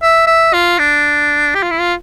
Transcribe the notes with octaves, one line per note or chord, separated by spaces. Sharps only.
E5
E5
F4
D4
G4
F4
E4
F4